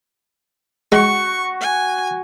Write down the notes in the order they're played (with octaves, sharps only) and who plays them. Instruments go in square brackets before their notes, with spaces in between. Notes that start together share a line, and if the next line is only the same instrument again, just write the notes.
[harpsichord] G#3 [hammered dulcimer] F#4 [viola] C#6
[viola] G#5